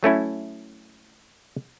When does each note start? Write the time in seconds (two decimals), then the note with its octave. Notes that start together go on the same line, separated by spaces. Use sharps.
0.03 F#3 A3 C#4 E4